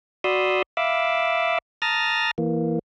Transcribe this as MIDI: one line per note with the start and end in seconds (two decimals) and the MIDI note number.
0.24 0.62 66
0.24 0.62 74
0.24 0.62 83
0.24 0.62 84
0.24 0.62 87
0.24 0.62 88
0.77 1.58 76
0.77 1.58 77
0.77 1.58 83
0.77 1.58 86
0.77 1.58 88
1.82 2.31 81
1.82 2.31 82
1.82 2.31 87
1.82 2.31 89
1.82 2.31 93
1.82 2.31 94
2.38 2.79 52
2.38 2.79 58